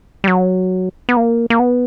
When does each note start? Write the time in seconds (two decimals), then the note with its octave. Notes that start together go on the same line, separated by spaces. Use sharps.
0.24 G3
0.27 F#3
1.09 B3
1.17 A#3
1.50 A#3
1.60 B3